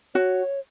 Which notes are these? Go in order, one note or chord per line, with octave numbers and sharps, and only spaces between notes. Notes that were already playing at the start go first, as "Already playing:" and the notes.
F#4 C#5